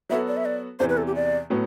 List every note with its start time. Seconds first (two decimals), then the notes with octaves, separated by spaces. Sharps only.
0.09 F#3 B3 F#4 A4 E5
0.28 D5
0.37 E5
0.45 D5
0.79 E2 C3 E3 C5
0.89 B4
0.97 A4
1.07 G4
1.15 D5
1.50 A2 F#3 B3